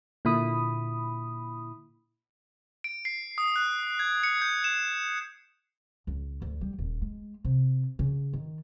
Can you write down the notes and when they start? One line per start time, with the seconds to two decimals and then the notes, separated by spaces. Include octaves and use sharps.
0.25 A#2 D3 E4 B5 D#6
2.84 D7
3.05 C7
3.38 D#6
3.56 F#6
3.99 G#6
4.23 C#7
4.42 G6
4.64 E7
6.07 C#2
6.42 D2
6.61 G3
6.79 D#1
7.01 G#3
7.45 C3
7.99 C#3
8.33 D#3